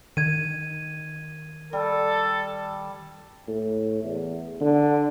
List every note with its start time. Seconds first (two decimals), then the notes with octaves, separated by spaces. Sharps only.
0.17 D#3 G#6 D#7
1.73 G3 A4
3.47 A2
4.04 E2
4.61 D3